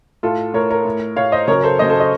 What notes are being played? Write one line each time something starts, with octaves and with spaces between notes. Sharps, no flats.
A2 F4 A4
A2 A#4 C#5
A#4 C#5
A2
A2 C#5 F5
C5 D#5
F#2 C#3 A#4 C#5
A4 C5
F#2 C#3 C5 D#5
A4 C5
C5 D#5